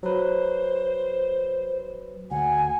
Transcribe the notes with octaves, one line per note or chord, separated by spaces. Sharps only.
F#3 B4 C5
D2 F#5 G#5